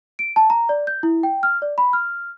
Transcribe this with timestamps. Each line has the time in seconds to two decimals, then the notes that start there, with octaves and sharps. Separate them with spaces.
0.19 D7
0.36 A5
0.50 A#5
0.69 D5
0.87 G6
1.03 E4
1.23 G5
1.43 F6
1.62 D5
1.78 B5
1.93 F6